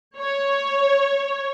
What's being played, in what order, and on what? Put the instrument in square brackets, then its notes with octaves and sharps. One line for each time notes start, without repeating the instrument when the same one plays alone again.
[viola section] C#5